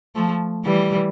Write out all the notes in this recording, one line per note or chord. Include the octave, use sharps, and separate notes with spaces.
F3 A3
E3 G3